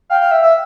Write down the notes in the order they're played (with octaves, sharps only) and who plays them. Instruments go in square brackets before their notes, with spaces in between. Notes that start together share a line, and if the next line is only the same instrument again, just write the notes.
[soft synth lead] F5 [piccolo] G5
[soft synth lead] F5
E5
E5